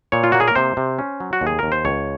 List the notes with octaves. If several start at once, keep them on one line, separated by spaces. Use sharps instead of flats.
A#2 C#5
F4
A#3 F#4
G#4
A#4
C3 C5
C3
C#4
F#3
F#4
D#2
G#4
D#2 A#4
C5
C#2 C#5